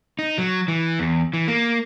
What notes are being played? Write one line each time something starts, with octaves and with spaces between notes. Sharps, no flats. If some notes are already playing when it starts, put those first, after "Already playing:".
D#4
F#3
E3
E2
E3
A#3